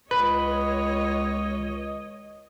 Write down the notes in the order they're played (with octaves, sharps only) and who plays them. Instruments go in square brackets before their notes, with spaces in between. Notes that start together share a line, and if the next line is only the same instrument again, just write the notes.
[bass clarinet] C#2 [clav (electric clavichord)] B4 [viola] C#5 D#5